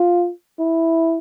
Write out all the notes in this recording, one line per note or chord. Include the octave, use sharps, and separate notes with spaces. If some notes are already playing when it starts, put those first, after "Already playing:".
Already playing: F4
E4